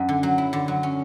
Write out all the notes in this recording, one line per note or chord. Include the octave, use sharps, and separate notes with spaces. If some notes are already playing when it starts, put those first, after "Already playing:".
Already playing: F#2 D4
D3
F#3
E4
D3
F#3
C#4